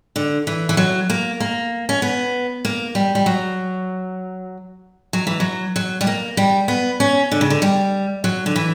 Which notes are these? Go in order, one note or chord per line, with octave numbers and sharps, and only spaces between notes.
D3
E3
E3
F#3
A#3
A#3
C#4
B3
A#3
G3
G3
F#3
F#3
E3
F#3
F#3
G3
A#3
G3
B3
C#4
D3
C#3
D3
G3
F#3
D3
E3